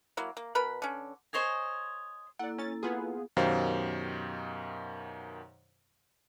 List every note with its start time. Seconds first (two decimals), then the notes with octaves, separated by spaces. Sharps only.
0.17 F#3 A#3 E4
0.37 A#3
0.55 B2 A#4 B4 B5
0.82 D3 C#4
1.33 C5 C#5 D#5 G#5
2.39 A#3 E4 A4 D5 F#5
2.58 C#4 A6
2.83 B3 F4 G#4
3.37 F#2 B2 D#3 G4 C5 F5